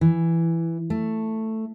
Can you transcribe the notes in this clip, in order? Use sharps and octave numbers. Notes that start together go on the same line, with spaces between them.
E3
A3